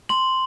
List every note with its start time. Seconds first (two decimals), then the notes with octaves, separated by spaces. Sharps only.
0.09 C6 F#7